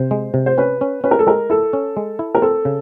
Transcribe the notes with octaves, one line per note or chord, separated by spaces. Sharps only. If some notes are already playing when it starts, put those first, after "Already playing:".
Already playing: C3 C5
G#3
C3
C5
C#4 B4
C#4
C#4 B4
A#4
A4
G#3 A#4
E4 A4
C#4
G#3
E4
A#4
C4 A4
C#3